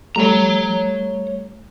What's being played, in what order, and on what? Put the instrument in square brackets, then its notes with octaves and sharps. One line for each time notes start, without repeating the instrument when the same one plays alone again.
[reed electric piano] G3 A3 [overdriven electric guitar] C#5 A#5